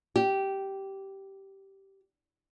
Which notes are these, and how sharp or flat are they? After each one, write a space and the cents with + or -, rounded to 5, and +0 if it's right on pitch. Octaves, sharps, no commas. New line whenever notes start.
G4 -10